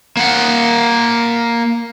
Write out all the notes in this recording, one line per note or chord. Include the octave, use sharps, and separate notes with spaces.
A#3 F#5